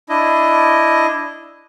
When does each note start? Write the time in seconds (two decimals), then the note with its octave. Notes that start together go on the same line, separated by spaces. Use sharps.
0.09 D4 E4 D#5